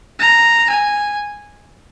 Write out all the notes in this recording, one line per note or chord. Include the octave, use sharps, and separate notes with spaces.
A#5
G#5